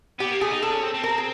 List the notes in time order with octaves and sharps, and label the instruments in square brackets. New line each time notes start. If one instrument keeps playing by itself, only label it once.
[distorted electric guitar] B3 [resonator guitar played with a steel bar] G4
[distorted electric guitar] A#3
[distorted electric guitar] A3 [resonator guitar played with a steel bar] G#4
[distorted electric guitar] D#4
[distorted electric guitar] D4 [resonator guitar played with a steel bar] A4
[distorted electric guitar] C#4
C4
C4
[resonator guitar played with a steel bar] A#4
G#4